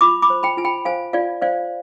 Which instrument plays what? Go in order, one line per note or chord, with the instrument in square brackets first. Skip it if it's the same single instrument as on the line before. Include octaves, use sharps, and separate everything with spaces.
[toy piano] F4 B5 D6
B5 D6
C5
G5 B5
F4 G#5
G5 B5
C5 F5 G#5
F4 D5 F5
C5 D5 F5